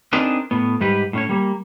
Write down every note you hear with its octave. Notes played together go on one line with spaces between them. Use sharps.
C4 D4 D#4 G#4 A#4 B4
A2 B3
G#2 G3 G4 B4
A2 C#4 C#5
G3 A#3